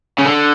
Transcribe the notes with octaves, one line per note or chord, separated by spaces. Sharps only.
C#3
D3